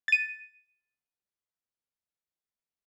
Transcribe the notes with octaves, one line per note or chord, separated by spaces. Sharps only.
A6 D#7